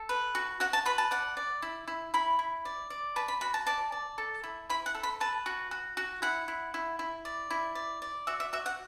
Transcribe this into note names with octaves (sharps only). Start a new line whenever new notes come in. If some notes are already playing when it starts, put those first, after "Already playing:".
Already playing: A4
B4
F#4
F#4 F#5
A5
B4 B5
A5
D5 F#5
D5
E4
E4
E4 B5
E4
D5
D5
B4 A5
B5
F#4 B5
A5
D5 A5
D5
A4
E4
E4 B5
F#5
A4
B5
B4 A5
F#4
F#4
F#4
E4 F#5
E4
E4
E4
D5
E4
D5
D5
F#4 E5
E5
F#4 E5
F#5